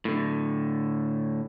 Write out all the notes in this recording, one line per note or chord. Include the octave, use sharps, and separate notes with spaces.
A2 D3